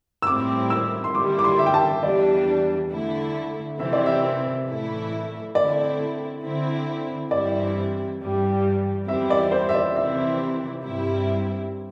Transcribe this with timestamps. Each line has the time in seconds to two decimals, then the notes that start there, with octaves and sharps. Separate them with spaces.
0.22 E6
0.27 A2 G3 C4 E4 D6
0.70 E6
1.04 C6
1.15 D3 G3 E4 D6
1.39 D6
1.44 C6
1.58 E5
1.66 G5
1.74 A5
2.03 E2 E3 G3 D4 D5
2.91 D3 A3 E4
3.79 C3 E3 C4 E4 E5
3.93 D5
4.06 E5
4.67 A2 E3 A3 E4
5.55 D3 A3 C4 E4 D5
6.44 D3 C4 E4
7.31 G2 E3 G3 C4 E4 D5
8.20 G2 E3 G3
9.08 E2 E3 G3 C4 E4 E5
9.30 D5
9.51 C5
9.69 E5
9.74 D5
9.96 C3 E3 C4 E4 E5
10.84 G2 G3 C4 E4